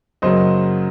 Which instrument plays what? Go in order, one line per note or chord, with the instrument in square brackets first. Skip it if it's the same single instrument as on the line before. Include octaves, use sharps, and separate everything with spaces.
[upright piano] F#2 C#3 F#3 A#3 C5 D#5